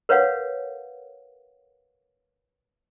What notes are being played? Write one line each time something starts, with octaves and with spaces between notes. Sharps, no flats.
A#4 B4 C#5 F5 F#5